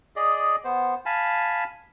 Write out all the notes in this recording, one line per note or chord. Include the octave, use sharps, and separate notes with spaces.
G#4 D5 D#5
B3 C5
F5 G#5 A5 B5